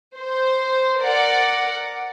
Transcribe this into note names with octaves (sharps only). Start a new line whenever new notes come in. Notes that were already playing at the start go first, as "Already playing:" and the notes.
C5
A#4 D5 F#5